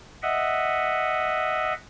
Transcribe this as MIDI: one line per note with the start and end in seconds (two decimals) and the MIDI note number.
0.23 1.73 75
0.23 1.73 76
0.23 1.73 78